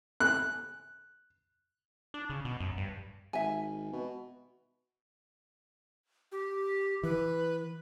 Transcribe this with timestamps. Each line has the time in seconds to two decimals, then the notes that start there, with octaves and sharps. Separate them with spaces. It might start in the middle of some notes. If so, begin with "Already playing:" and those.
0.20 F#6
2.14 D4
2.30 C#3
2.45 B2
2.60 F#2
2.77 G2
3.33 G#1 E5 G#5
3.92 B2
6.32 G4
7.03 E3 B4